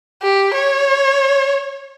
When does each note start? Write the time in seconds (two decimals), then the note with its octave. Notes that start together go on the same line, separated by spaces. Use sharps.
0.22 G4
0.54 C#5